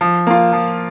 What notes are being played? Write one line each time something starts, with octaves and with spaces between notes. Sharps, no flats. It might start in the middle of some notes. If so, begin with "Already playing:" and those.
F3
A#3 F4
F3